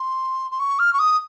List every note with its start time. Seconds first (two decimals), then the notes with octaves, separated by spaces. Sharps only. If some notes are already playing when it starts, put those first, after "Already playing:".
Already playing: C6
0.51 C6
0.60 C#6
0.79 F6
0.93 C#6
0.99 D#6